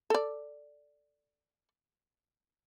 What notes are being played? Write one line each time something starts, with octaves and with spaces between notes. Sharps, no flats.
A4 D5